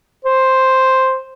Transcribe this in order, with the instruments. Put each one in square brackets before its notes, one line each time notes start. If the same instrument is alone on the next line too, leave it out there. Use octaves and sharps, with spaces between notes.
[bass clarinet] C5